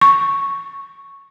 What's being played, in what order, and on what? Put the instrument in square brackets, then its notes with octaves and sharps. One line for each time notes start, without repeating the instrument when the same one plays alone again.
[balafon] C#6